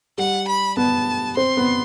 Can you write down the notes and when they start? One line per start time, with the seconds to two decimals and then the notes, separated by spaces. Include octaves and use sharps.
0.18 G3 F#5
0.48 B5
0.77 B3 A5
1.37 C4 C6
1.57 B3